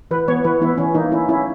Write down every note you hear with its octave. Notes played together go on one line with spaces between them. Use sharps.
E3 B4
B3 C#5
E3 B4
B3 E4
E3 C#4
A#3 D#4
C#4 E4
C#4 E4